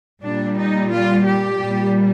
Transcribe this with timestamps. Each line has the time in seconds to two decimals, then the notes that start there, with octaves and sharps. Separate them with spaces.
0.23 A#2 G3 D4
0.57 D#4
0.92 F4
1.26 G4
1.60 A#2 G3